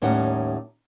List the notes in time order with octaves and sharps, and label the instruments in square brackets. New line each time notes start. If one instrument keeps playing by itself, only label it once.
[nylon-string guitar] D#2 A2 G3 C#4 D#4 F#5